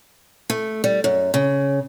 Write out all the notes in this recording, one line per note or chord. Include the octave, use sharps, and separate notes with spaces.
A3
G3
F#2
C#3